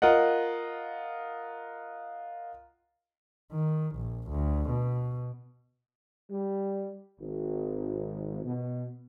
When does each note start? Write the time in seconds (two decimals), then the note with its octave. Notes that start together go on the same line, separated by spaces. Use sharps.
0.02 F4 A#4 D#5 F#5
3.52 D#3
3.96 A#1
4.30 D2
4.70 B2
6.31 G3
7.21 G#1
8.44 B2